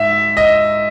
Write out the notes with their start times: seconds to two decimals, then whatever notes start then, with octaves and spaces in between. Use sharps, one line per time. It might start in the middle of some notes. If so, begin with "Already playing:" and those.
Already playing: G#2 E5
0.37 D#5